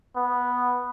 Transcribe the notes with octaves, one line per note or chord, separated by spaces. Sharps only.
B3